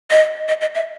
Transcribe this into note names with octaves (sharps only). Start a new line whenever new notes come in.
D#5
D#5
D#5
E5